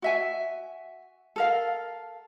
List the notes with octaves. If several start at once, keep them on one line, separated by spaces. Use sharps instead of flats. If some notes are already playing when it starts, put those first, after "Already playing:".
F#4 E5 G#5
A4 A#4 F5